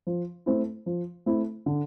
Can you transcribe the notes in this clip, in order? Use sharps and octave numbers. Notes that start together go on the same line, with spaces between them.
F3
A3 C4 E4
F3
A3 C4 E4
D3